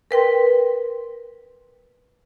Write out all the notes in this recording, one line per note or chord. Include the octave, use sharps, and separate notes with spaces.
A#4 B4 G5 C6